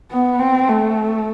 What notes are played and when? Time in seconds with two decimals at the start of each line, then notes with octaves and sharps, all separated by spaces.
0.11 B3
0.39 C4
0.69 A3